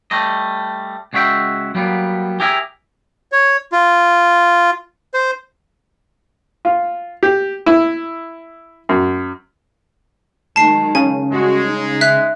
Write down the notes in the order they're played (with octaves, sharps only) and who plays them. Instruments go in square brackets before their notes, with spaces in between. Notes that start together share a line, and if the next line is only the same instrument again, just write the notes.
[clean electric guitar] G3 A3 D#5
C#2 G#3 F#4 C#5 E5 G5
F#3 G3 A#3 B3
G4 G#4 A#4 E5 F#5 G#5
[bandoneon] C#5
F4
C5
[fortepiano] F4
G4
E4
F#2
[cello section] D#3 F#3 G#3 [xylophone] A5 C7
[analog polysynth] C#3 [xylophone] G#5
[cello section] G3 F#4 [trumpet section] G#3
[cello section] D#4
[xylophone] E5 F#6 B6